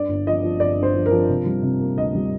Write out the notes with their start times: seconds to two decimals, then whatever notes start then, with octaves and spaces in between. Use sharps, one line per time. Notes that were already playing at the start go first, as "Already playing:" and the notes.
Already playing: G2 D5
0.09 G1
0.27 F3 D#5
0.43 F3
0.60 G1 D5
0.77 G2
0.83 C5
0.95 F3
1.06 A#4
1.11 F3
1.29 C3
1.46 G3
1.62 C3
1.80 A#3
1.96 D2 D#5
2.15 G3